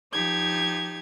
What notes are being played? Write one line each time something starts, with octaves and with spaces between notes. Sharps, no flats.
F3 D#4 G4 G#6